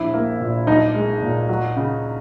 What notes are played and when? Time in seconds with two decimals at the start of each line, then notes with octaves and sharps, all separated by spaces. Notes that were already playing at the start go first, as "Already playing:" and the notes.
Already playing: A#1 E4
0.14 A#3
0.40 A#2
0.67 B1 D#4
0.94 G#3
1.22 A#2
1.49 F#3
1.76 C#3